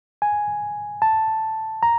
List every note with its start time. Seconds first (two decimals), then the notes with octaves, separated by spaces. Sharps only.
0.22 G#5
1.02 A5
1.83 A#5